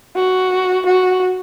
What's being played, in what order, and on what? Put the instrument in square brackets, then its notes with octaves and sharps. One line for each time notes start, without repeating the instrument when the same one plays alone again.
[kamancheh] F#4
F#4